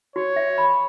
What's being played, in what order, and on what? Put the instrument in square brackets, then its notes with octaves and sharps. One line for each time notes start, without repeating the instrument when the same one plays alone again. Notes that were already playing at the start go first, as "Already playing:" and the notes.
[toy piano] F#4 [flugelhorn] C#5
[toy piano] E5
B5